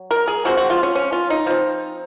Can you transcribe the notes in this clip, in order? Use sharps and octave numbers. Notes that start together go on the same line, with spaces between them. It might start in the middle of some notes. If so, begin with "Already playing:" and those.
Already playing: F#3
A#4
G#4
F3 G#3 C4 F#4
F#4
F4
C#4
C#4
F4
D#4
F3 C4